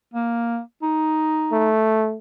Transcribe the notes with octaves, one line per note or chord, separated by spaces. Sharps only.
A#3
D#4
A3